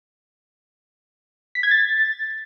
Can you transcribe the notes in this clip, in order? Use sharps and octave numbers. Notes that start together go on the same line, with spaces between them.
B6
G#6
A6